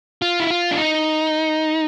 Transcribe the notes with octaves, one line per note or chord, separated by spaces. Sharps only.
F4
E4
F4
D4
D#4